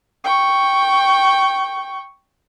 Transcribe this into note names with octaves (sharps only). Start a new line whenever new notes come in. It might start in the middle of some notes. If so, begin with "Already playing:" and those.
G5 C#6